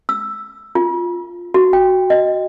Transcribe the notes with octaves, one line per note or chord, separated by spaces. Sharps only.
E6
F4
F#4
G5
D#5